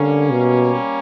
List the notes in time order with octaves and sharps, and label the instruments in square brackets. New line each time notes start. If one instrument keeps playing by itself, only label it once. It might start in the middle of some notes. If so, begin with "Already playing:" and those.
Already playing: [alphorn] D3 [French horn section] G3 A#3 C#4
[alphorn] B2